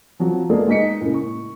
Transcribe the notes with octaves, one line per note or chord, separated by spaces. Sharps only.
F3 F#3 C4 F#4
G#3 A#3 B3 G#4 A4 D5
G#3 D#4 D#5 B6 C#7
A2 C#3 A#3
C#6